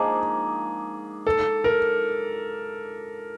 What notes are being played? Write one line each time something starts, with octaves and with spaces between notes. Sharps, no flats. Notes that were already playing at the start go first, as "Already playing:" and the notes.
Already playing: G#2 F3 A#3 D4 G#4
A4
A#4